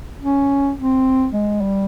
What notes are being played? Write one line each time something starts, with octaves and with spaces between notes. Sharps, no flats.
C#4
C4
G#3
G3